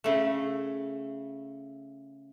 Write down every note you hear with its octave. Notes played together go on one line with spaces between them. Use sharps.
C#3 A3